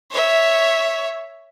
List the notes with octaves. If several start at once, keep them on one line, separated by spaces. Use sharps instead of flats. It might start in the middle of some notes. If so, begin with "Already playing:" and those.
C#5 E5